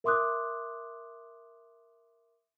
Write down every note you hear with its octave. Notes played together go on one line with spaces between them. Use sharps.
A#4 E5 C6 D6 D#6 F#6